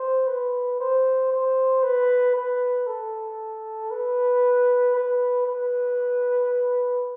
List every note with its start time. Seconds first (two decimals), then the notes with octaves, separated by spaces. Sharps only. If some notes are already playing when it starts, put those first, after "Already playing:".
Already playing: C5
0.27 B4
0.80 C5
1.32 C5
1.83 B4
2.36 B4
2.87 A4
3.90 B4
4.95 B4
5.47 B4